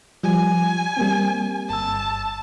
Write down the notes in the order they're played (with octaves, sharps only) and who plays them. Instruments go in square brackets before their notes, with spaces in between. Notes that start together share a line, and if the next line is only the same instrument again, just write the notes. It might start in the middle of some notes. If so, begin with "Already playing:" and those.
[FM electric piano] F3 G3 [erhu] G#5
[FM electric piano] G3 A#3 C4
[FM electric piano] G1 E6 [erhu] A5